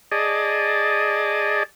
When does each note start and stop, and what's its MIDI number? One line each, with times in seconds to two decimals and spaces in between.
0.12 1.63 68
0.12 1.63 74
0.12 1.63 75
0.12 1.63 81